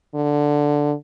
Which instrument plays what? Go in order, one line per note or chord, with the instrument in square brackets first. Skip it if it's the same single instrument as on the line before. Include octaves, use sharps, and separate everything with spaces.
[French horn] D3